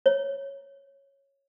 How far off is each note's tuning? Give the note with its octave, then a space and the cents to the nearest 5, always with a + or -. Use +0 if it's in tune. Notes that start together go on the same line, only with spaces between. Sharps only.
C#5 -5